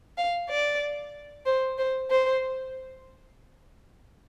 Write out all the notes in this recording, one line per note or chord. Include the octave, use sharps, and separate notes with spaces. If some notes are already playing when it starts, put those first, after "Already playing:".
F5
D5
C5
C5
C5